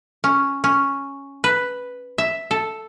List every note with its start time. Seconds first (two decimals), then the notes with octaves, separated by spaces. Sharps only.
0.24 C#4
0.64 C#4
1.44 B4
2.18 E5
2.51 A4